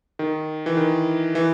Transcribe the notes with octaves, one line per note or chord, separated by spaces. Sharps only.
D#3
E3
D#3
E3